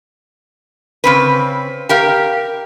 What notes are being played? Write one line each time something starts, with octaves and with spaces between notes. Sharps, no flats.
C#3 C4 B4
G4 A#4 F5